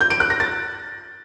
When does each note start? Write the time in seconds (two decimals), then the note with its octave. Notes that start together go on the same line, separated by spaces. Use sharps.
0.01 G6
0.10 D7
0.20 F#6
0.30 A#6
0.40 A6